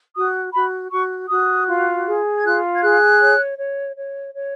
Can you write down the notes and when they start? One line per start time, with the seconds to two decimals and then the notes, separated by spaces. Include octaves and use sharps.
0.15 F#4 D#6
0.53 F#4 B5
0.92 F#4 C#6
1.29 F#4 D#6
1.67 F4
2.06 G#4
2.35 G#6
2.43 F4 F#6
2.74 G#6
2.82 G#4 F#6
3.20 C#5
3.58 C#5
3.96 C#5
4.34 C#5